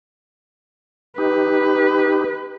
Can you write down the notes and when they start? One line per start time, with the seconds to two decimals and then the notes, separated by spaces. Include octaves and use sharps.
1.18 D#4 G4 B4